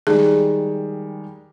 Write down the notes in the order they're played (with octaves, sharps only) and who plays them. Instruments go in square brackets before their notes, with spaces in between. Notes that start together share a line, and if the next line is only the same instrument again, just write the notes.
[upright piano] D#3 G3 G#3 [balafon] G#4